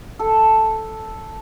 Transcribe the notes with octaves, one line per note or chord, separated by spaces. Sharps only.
A4